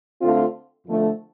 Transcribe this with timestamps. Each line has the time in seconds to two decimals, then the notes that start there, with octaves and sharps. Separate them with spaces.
0.21 D3 A3 C4 F4
0.86 F2 D3 F3 A3